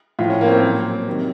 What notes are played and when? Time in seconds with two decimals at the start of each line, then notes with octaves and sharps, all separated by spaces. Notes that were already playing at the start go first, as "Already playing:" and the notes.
0.19 A2 F3 F4
0.30 C#4
0.41 A#3
0.48 C4
0.52 A#3
0.63 A#2 F#3
1.07 C3 D#3 F#3